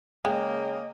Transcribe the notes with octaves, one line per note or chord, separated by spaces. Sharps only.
C#3 G#3 A#3 D#5 G5